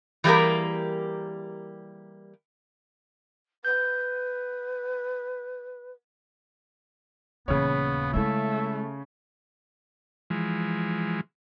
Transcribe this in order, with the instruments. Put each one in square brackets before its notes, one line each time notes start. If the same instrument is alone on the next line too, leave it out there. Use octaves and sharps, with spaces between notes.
[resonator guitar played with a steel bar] E3 G3 A#3 G4 G#4 A#4
[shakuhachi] B4 [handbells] G6
[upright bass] D#1 E3 [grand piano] C#3 C#5 [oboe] B3
[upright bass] G#3 E4 [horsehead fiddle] A3 [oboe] E5
[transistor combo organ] E3 F3 G#3